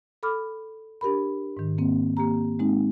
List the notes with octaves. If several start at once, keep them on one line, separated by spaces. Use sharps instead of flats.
A4 B5 D6 F6
D4 G4 A#4 B5
G#2 D#3
A#3 C4
A#3 G4 A#5
G#3 C4 D#4